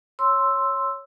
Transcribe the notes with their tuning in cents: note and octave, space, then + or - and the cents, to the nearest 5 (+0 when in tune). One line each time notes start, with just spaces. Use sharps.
C#5 +0 C6 +0 E6 +0